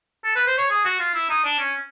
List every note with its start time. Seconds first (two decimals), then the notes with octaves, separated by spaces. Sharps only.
0.24 A4
0.35 B4
0.47 C5
0.58 C#5
0.70 G#4
0.84 F#4
1.00 F4
1.14 E4
1.30 D#4
1.44 D4
1.58 C#4